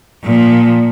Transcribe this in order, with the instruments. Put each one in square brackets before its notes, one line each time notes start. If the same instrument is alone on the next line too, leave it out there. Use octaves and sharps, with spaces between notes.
[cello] A#2 F3